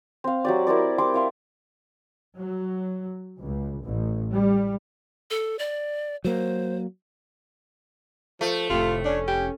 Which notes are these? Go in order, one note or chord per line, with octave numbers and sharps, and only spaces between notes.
C4 F5
F#3 G4 D5
E4 A#4 C5 D5
G3 C6 D6
E5 F5 C6
F#3
C#2
A1
G3
A4
D5
F#3 A#3 C5
F3 A3
F1 A2 C3 F4
C#4 D4
G4